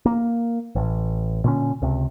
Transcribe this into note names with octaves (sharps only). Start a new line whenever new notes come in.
A#3
A1
A#2 D3 C#4
C#2 C3